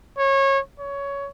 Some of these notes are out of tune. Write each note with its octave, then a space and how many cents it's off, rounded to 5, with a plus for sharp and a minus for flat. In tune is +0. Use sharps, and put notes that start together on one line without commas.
C#5 -25
C#5 +15